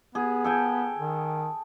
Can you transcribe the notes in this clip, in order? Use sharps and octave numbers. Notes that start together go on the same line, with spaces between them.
B3 G#4
A4 G5 G#5
D#3